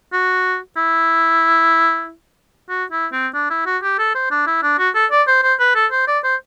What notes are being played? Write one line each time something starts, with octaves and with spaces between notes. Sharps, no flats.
F#4
E4
F#4
E4
C4
D4
E4
F#4
G4
A4
C5
D4
E4
D4
F#4
A4
D5
C5
C5
B4
A4
C5
D5
C5